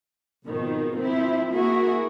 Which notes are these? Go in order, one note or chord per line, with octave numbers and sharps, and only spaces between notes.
G#1 B2 D#3 F3
F3 C4 E4
A#3 E4 F#4 G#4 A#4